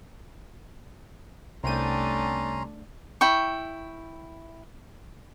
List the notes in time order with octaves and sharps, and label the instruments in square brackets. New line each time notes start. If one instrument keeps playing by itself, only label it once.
[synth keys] C2 G5 D#7 [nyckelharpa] A3 D4 [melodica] C#4 A#5 C6
[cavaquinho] E4 G5 C#6